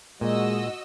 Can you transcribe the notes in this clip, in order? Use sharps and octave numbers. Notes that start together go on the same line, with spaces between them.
A#2 G#3 F#4 D#5 E6